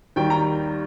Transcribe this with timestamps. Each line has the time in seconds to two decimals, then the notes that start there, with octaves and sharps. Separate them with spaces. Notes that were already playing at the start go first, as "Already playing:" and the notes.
0.16 D#2 D#3 G3 G5
0.30 A#5